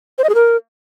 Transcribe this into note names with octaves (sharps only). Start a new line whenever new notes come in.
C5
D#5
G#4
A#4